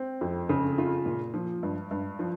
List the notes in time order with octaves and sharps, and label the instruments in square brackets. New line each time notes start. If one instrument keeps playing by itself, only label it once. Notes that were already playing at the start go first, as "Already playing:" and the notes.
Already playing: [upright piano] C4
F2
C#3
F4
A#2
F3
G2
G2
F3